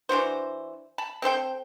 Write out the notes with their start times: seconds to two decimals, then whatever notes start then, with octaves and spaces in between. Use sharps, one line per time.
0.09 E3 D4 F#4 C5
0.98 A5 B5
1.22 C4 A4 C5 G5